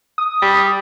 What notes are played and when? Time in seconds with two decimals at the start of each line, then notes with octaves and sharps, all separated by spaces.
0.18 D#6
0.42 G3